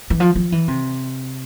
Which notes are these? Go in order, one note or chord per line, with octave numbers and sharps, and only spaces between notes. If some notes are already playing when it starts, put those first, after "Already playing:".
E3
F3
F3
E3
C3